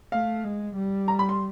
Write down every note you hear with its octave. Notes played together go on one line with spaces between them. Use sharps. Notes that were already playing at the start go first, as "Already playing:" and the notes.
A3 F5
G#3
G3
A#5
B5
C6